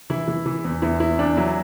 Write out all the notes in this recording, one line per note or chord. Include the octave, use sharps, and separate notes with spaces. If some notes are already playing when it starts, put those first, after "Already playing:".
E3 E4
E3
E3
E2
E2 E4
E2 E4
E2 D4
F#3 E4